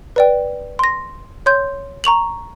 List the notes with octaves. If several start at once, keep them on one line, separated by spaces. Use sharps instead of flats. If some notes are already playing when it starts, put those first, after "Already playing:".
B4 D5 G5
C6 A#6
C#5 C6 G6
A#5 C#6 F7 F#7